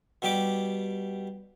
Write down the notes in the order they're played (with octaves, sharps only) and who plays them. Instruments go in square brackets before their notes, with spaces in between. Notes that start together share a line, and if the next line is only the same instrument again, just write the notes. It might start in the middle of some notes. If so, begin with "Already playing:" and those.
[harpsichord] B2 G3 G4 D6